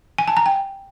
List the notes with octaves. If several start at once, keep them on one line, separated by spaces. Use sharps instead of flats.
G#5
A5
A#5
G5